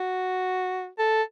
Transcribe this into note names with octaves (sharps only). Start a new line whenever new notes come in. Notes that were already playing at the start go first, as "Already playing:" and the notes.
Already playing: F#4
A4